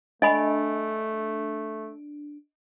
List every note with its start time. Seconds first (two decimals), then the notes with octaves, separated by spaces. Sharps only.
0.22 A3 D4 D#5 G#5 B5